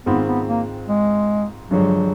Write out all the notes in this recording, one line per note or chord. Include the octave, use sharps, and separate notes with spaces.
G#2 D#3 G#3 B3 C4 F4
B3
A#3
G#3
G2 D3 F3 F#3 G#3